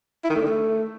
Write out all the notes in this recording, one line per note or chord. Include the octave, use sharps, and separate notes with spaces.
E4
D#3
A3
D3
A3